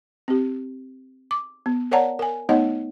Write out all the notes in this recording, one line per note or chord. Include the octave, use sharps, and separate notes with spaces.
C4 G4
D6
B3
A#4 C#5 D5 F#5 A5 A#5
A#4 G#5
A3 B3 D#4 C#5 D#5 F#5